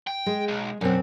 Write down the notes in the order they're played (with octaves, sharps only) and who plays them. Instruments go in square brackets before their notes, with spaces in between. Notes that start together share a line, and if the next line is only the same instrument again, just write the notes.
[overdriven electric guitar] G5
[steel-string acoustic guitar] G#3
[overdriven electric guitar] B1
[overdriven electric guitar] B1 [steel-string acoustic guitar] F#2 C4